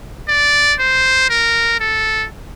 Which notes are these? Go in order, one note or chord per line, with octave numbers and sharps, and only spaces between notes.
D5
C5
A#4
A4